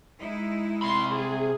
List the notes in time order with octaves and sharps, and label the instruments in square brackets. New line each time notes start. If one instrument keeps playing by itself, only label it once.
[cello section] G#3 D#4 E4
[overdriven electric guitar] C3 B5 [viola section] C6
[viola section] G#4